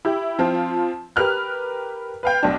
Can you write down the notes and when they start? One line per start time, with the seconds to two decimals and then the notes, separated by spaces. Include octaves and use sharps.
0.05 E4 G4
0.39 F3 C4 F4
1.16 G4 A#4 B4 F6 F#6
2.23 B4 F5 G5
2.43 B1 D4